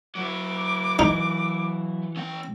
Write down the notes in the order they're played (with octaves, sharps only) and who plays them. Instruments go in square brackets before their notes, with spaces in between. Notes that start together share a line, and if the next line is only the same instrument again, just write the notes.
[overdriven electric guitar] F#3 E4 [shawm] D6
[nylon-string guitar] E3 [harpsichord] D#4
[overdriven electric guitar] C#4 G5